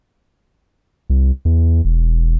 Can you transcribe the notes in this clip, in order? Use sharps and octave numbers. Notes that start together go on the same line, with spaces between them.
C2
E2
E1